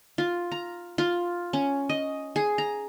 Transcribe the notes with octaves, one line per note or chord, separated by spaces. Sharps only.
F4
A#5
F4
C#4
D#5
G#4
A#5